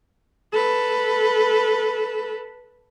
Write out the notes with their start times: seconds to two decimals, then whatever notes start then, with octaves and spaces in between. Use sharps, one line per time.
0.52 A4 B4